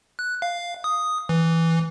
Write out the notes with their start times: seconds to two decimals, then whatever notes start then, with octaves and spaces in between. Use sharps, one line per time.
0.19 F#6
0.42 F5
0.84 D#6
1.29 E3